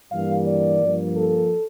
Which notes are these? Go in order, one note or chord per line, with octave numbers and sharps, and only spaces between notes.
G2 E3 G3 A#3 F5
D5
G2 F3 A#3
A4